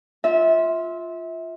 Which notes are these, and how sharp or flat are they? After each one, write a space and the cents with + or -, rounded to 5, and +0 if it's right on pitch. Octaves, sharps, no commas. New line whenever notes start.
F4 +0 E5 -25